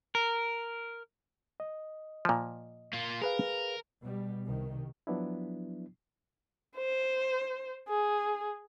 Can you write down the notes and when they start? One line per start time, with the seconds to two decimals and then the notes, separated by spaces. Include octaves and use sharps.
0.15 A#4
1.60 D#5
2.25 A#2 F3
2.93 A#3 F4
3.22 G#4 A#4 B4 F5
4.01 B2 G3
4.46 C2 C3 D#3
5.07 F3 F#3 B3 D4 E4
6.77 C5
7.89 G#4